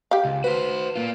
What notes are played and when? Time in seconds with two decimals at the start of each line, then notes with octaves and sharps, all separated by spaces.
0.11 G4 F5
0.25 C#2
0.44 F#4 B4 C5
0.96 A#3 F4